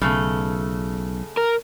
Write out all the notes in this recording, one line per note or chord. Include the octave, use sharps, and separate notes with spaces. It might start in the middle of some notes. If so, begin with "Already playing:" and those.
B1 C#3 A3 A4
A#4